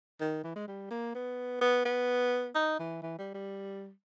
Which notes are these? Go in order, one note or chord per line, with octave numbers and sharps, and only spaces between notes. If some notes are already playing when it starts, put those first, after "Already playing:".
D#3
E3
G#3
G3
A#3
B3
B3
B3
D#4
E3
E3
G3
G3